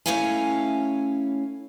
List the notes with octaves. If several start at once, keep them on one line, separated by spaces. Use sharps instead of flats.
A3 C#4 E4 C#5 F5 G#5